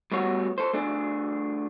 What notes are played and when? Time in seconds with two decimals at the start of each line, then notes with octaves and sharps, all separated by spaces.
0.12 G3 A3 B3 F#4 C#5
0.58 A4 C5
0.73 A3 D4 G#4